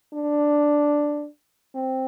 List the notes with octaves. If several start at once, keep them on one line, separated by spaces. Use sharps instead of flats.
D4
C4